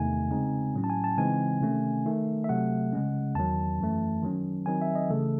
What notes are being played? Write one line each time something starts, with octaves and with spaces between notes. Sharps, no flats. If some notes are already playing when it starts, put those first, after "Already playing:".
Already playing: E2 C3 D#3 A3 D#4 G#5
C#3 G#3 C4 D#4
A2 F#3 C#4
A5
G#5
A5
C#3 E3 G#3 C4 D#4 G#5
C3 D#3 A3 C#4
D#3 A3 D#4
E5
C3 F#3 A3 F#5
C#3 G#3 C#4
E2 D#3 F#3 A5
F#2 E3 A3
D#3 F#3 C#4
D#3 F#3 C4 D#4 G#5
E5
D#5
C#3 E3 A3 A4